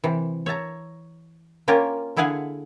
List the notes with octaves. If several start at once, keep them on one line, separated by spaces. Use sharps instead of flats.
C3 E3
C#5 E5 A5 A#5
A#3 C#4 F4 G4 A#4
D3 E4 G#4 F5 F#5 G#5